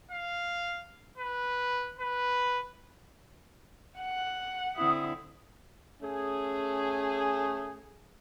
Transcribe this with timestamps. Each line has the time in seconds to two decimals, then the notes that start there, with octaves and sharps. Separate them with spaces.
0.11 F5
1.18 B4
1.99 B4
3.99 F#5
4.76 D3 C4 E4 D#6
6.01 A3 C#4 G#4